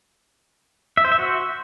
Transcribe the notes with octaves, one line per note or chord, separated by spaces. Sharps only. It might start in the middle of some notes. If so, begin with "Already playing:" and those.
E5
C5
E5
F#4